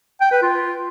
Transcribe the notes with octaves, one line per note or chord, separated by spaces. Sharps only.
G5
B4
F4